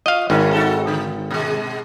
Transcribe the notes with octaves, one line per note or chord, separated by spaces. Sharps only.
F4 D#5 F5
G#1 C#3 D#4 A#4
D#4 F#4 A4
D3
B2 G#3